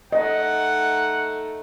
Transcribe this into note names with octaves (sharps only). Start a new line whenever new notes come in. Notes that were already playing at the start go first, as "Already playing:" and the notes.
A3 D#4 D#5 F#5